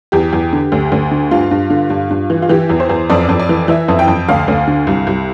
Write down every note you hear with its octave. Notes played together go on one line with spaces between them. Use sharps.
E2 G4
E2
D3
D2
D2
D3
G2 F4
G2
D3
G2
G2
E3
F4
E3 G4
E2
C5
E2
F2 D5
F2
D5
E3
E3 E5
F2
G5
F2
D2 F5
D2
D3
C2
C2